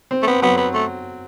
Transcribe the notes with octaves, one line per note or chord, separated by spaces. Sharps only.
C4
A3
B3 C4
F#3 B3
B3
A3